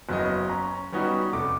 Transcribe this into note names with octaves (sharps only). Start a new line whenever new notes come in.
F#1 F#3 B3 D#5
C#4 A#5
G3 B3 C#4 D#4 F#4
F1 A3 D6